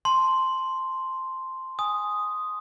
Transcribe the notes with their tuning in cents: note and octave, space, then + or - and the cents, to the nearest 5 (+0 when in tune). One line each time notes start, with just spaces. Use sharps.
A5 +0 C6 +0
G#5 +0 D#6 +0